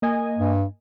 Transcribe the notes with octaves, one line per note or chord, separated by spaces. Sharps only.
A#3 D#5 G#5
G2